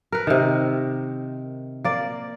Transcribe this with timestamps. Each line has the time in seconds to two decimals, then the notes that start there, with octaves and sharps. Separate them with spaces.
0.12 A#4 B4
0.27 C3 D#3
1.84 A#3 D5